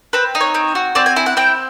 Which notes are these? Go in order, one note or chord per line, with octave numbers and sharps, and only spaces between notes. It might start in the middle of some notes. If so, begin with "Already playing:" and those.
C4 B4
D#4
C#5
C4
F#4
C4 D5
G#5
E4 G#5
F#5
C4 G5